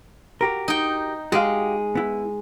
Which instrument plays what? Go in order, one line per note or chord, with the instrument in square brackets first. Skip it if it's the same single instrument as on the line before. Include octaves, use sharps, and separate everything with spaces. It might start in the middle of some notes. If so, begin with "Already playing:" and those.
[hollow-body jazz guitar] F#4 G4 A#4
[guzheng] D#4 G5
[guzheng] G#3 [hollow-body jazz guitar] F#4 G4 F5
[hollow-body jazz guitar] B3 E4